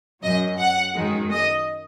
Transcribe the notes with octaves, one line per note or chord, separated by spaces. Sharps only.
F#2 F#3 D#5
F#5
F#2 D#3 G#3
D#5